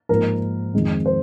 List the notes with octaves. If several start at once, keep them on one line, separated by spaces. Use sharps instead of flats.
G#2 F3 A#3 A#4
F2 D#3 G#3 C4
C5